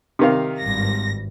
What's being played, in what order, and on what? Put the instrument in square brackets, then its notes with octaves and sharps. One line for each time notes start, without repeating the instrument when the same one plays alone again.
[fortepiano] C3 D#3 F5
[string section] G#1 G2 A#6